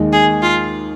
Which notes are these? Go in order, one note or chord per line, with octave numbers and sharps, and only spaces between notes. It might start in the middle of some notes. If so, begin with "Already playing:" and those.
Already playing: D#2 D#3 G#3 D#4
G#4
F4